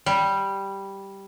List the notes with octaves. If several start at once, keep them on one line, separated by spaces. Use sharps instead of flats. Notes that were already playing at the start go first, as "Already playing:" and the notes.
G3